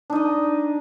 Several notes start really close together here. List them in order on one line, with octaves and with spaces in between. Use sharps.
D4 D#4 D#5